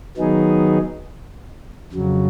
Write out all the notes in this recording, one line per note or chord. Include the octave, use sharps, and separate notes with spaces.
D#3 F#3 B3 D#4 G#4
F2 C#3 F#3